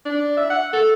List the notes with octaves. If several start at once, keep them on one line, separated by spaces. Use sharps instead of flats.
D4
E5
F#5
A4